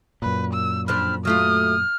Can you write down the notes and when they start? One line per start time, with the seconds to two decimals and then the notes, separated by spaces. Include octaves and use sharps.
0.22 F#2 A#2 B4
0.54 E6
0.88 F2 D4 C5 B5 F6
1.25 F#3 A3 F4 D#6 F6